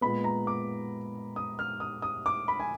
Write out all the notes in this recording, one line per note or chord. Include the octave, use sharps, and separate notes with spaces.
A#2 G#3 B3 B5
A#5
D6
D#6
F6
D#6
D#6
D6
B5
G#5